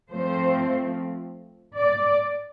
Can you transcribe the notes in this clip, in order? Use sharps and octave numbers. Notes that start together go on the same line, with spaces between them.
F3 A3 C4 C5
D5